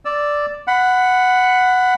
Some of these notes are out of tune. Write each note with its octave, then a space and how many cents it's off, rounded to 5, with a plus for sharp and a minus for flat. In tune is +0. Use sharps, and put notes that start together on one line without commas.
D5 +0 E6 +0
F#5 +0 B5 +20